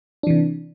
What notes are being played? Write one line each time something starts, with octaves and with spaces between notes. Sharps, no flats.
C3 E3 D4